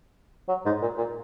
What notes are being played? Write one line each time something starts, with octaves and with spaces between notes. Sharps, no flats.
F#3
G#2
A#2
A#2